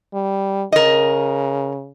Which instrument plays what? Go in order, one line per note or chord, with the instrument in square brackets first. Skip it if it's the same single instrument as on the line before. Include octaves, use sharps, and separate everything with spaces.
[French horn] G3
[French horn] C#3 [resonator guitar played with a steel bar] A#4 D#5